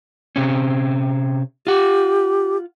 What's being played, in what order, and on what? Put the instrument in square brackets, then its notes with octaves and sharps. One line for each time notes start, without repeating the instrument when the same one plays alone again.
[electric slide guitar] C3 C4 C#4
[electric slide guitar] F4 F#5 [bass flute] G4